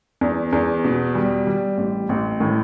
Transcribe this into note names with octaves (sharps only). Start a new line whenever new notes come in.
E2
E2
B2
G3
G3
A1
A1
A2